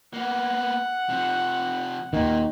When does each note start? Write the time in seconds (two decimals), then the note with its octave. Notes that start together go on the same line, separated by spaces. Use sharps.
0.14 A#3 B3 F#5
1.09 C3 F3
2.13 D#2 A#2 D#3